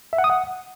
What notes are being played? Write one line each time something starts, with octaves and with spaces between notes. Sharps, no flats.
E5
F#5
D#6
F#5